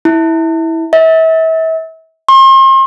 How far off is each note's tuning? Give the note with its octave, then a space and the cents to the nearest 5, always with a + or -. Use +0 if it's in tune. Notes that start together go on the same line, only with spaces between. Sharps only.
E4 -15
E5 -35
C6 +40